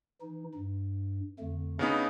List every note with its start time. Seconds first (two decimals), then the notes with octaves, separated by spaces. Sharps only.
0.21 E3 D#4
0.55 G2
1.39 F2 D3 A3
1.79 C#3 B3 D4 D#4